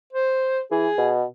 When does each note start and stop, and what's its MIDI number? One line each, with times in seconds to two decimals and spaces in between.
0.13 0.60 72
0.71 0.88 52
0.71 1.13 68
0.98 1.25 47